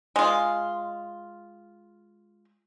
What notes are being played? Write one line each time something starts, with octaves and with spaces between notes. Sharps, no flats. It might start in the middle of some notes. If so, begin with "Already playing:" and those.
G#3 F4